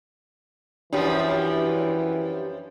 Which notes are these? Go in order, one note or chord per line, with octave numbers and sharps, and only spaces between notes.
F#2 E3 F3 G3 D4 G4